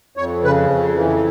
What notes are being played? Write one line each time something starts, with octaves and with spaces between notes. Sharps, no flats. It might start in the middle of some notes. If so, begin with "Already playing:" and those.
F2 C#5
C#3 B4
F2
E3